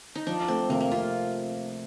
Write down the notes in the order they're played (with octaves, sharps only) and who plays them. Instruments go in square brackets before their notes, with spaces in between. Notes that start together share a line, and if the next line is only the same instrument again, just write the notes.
[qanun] D#4
[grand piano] F3 [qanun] D4
[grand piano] A3 [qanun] C4
[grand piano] C3 [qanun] A#3
[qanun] A#3
[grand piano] C3 [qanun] F4